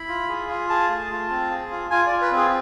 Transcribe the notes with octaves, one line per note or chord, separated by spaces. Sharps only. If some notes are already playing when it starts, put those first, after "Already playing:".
Already playing: E4 B5
F4
G#4
F4
G#4 A5
A3
F4
C4
G#4
F4
F4 G#5
D5
F4
B4
C4
G#4